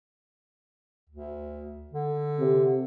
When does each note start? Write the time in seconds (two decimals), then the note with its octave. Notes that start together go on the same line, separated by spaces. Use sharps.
1.10 D2
1.93 D3
2.39 C3